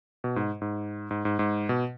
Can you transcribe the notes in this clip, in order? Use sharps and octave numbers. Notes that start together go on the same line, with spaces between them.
B2
G#2
G#2
G#2
G#2
G#2
B2